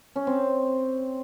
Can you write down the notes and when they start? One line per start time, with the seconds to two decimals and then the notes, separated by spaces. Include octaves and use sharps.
0.16 C#4
0.27 C4